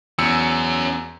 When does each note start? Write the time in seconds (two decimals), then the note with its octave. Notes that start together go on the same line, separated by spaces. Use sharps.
0.19 E2 F#3 C#4 E6 C#7